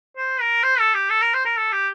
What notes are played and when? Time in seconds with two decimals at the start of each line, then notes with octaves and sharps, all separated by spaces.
0.17 C5
0.41 A#4
0.63 C5
0.79 A4
0.94 G4
1.10 A4
1.22 A#4
1.34 C5
1.45 A#4
1.57 A4
1.72 G4